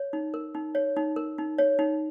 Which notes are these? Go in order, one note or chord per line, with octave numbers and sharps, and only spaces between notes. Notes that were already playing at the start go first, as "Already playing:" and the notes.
Already playing: C#5
D#4
A#4
D#4
C#5
D#4
A#4
D#4
C#5
D#4